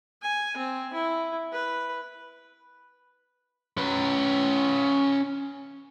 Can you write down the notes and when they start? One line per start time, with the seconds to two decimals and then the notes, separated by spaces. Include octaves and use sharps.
0.22 G#5
0.57 C4
0.93 E4
1.52 B4
3.78 C#4 B4